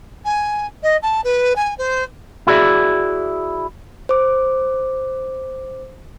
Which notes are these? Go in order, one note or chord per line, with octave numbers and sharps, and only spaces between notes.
G#5
D#5
A5
B4
G#5
C5
E4 F#4 G#4 D5 E5
C5 D6